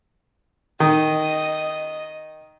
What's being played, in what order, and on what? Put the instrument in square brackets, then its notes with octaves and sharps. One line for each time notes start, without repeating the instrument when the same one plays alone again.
[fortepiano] D#3 [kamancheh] D#5